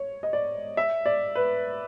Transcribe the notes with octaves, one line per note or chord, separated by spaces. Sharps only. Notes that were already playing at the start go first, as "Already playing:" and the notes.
Already playing: C#5
D#5
D5
E5
D5
B4